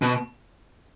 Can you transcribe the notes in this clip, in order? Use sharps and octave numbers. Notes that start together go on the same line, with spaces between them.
B2